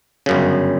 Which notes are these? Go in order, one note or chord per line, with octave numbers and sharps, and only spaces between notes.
G1 F#2 C#3